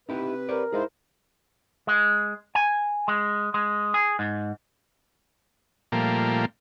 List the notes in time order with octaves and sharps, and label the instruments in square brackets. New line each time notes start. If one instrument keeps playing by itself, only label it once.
[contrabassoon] C3 [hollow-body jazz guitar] D#4 E4 G4 [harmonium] B4
[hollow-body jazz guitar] G4 C5 D5 [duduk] A#4
[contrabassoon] G#2 [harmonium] E4 C5 [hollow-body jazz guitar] G#4 D#5 F5
[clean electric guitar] G#3
G#5
G#3
G#3
G#4
G#2
[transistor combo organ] A#2 F3 G3 A3 A#3